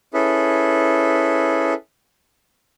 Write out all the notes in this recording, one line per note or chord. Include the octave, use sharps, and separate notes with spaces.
C#4 E4 G#4 A4 B4